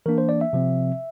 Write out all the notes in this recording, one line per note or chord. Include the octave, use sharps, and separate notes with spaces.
E3 A#3 D4 A#4
C5
D5
E5
C3 F3 C4